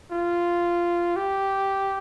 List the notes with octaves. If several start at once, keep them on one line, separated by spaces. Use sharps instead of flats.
F4
G4